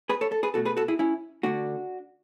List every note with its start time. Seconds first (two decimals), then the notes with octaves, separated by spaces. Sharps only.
0.09 G#4 B4
0.21 A4 C#5
0.32 A4
0.43 G#4 B4
0.54 B2 F#4 A4
0.58 A3
0.65 G#4 B4
0.77 F#4 A4
0.88 E4 G#4
0.99 C#4 E4
1.43 D3 A3 D4 F#4